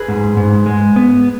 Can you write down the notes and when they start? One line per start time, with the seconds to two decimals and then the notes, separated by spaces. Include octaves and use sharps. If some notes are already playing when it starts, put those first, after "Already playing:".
Already playing: G#4 B4
0.08 G#2
0.37 G#2
0.66 G#3
0.96 B3